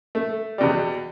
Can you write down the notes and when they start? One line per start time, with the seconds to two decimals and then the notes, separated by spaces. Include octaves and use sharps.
0.15 A3
0.58 E2 B2 G3